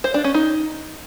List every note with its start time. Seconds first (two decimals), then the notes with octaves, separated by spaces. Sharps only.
0.04 C5
0.14 D4
0.24 C#4
0.34 D#4